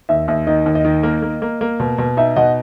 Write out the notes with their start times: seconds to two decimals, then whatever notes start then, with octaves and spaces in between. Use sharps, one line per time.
0.09 D#2 E5
0.28 D#2 E5
0.47 D#3 D#5
0.66 D#2
0.75 D#5
0.85 D#3
1.03 A#3
1.22 A#3
1.42 A#3
1.61 A#3
1.80 B2
1.98 B2
2.17 D#4 E5
2.36 B2 D#5 F#5